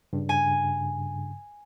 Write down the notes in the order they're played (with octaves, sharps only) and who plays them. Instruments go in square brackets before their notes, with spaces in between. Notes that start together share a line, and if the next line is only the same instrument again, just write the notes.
[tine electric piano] G2 C#3
[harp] G#5